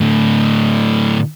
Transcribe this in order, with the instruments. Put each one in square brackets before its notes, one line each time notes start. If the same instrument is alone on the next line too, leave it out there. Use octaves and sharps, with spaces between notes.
[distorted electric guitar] A2 D3